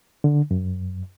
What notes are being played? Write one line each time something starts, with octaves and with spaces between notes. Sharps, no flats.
D3
F#2